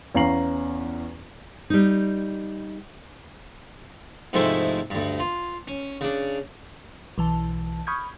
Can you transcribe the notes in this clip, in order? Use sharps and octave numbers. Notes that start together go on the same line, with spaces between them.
E2 C#4 F5 A#5 C7 F#7
G3 D#4
G#2 C3 F3 G#3 A3 E4
D2 G2
F4
C#4
C#3 D4
B1 E3 A5
B5 C#6 D#6 F6 G6 G#6